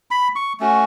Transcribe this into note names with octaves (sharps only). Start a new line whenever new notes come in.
B5
C#6
A3 C#4 F#4